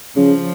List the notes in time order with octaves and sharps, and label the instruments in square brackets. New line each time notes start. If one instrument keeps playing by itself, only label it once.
[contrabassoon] C#3 [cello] F3